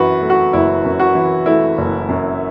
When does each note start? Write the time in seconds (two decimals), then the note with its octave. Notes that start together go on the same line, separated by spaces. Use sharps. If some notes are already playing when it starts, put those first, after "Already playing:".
Already playing: F#2 E3 F#4 B4
0.22 A3
0.30 F#4
0.53 F#1 E4
0.85 F#2
1.00 F#4
1.15 E3
1.46 A3 E4
1.78 F#1
2.09 F#2